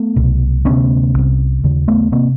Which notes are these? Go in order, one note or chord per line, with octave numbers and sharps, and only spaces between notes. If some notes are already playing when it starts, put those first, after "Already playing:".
Already playing: A3 B3
C2 B2
D2 C3 B3 C#4
C2 C3
D#2 C#3
A3 B3
C3 A#3 C4